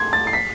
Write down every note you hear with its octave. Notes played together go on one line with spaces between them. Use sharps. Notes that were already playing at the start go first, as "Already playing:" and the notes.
Already playing: C6 G#6
A6
C7
B6